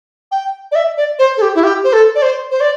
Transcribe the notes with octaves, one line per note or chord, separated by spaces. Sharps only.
G5
D5
E5
D5
C5
A4
G4
E4
G4
C5
A4
D5
C5
C5
D5